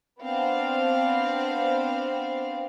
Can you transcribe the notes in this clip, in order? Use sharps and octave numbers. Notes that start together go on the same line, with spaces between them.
B3 C4 D4 F5